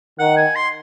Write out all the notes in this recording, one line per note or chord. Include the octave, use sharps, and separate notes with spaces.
D#3 F#5
G#5
C6